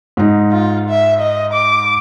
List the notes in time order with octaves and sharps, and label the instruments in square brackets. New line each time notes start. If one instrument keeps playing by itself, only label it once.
[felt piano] G#2 D#4
[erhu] F4
E5
D#5
D6